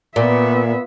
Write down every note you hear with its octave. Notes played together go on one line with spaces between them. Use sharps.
A#2 B3 E5